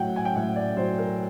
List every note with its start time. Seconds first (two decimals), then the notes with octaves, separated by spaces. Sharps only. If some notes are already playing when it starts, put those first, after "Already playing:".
Already playing: A2 F#3 F#5 G5
0.16 G#5
0.25 G5
0.36 A2 F#5
0.56 D5
0.77 F#3 C5
0.99 A#4